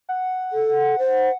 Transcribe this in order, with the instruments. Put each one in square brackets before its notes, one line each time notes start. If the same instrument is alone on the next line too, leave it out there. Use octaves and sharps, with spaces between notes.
[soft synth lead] F#5
[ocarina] A4
C5